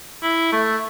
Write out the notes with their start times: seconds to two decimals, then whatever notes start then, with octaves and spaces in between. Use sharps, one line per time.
0.23 E4
0.52 A3